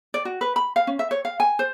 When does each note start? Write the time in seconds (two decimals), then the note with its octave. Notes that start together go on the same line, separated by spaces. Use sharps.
0.14 D5
0.25 F#4
0.41 B4
0.56 B5
0.76 F5
0.87 C#4
0.99 E5
1.11 C#5
1.25 F5
1.40 G#5
1.59 C5